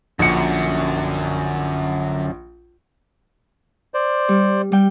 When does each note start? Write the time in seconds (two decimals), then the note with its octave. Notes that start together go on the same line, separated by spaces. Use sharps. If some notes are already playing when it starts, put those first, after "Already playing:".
0.19 A#1 F#2 D3 C#7
3.94 C5 D5
4.29 G3
4.72 G3 G5